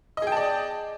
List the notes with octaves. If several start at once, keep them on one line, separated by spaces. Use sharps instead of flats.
G#4 D5 D#5 G5 A5